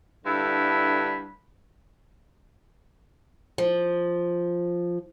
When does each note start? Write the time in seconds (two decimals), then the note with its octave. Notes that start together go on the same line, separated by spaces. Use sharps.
0.25 G2 D3 E4 A4 B5
3.58 F3